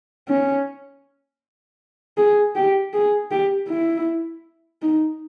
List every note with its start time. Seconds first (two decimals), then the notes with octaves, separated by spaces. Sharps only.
0.29 C#4
2.18 G#4
2.55 G4
2.93 G#4
3.31 G4
3.69 E4
4.82 D#4